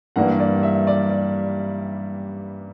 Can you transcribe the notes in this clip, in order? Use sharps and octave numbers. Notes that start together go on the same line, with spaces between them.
G2 E3 G3 A#3 F#5
D5
E5
D5
D5